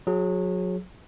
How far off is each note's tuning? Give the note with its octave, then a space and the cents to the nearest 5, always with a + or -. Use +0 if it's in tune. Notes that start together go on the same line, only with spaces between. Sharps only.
F#3 -25 G#4 +0